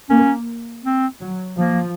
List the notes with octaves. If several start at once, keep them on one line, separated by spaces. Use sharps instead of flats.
A#3 C#4
C4
F#3
F3 A#3